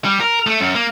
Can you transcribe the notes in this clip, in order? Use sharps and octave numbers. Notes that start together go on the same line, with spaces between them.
G3
A#4
A3
F#2
A#3